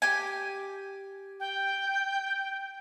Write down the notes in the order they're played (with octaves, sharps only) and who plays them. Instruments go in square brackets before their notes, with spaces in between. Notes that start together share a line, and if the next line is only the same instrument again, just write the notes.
[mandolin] G4 G#5
[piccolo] G5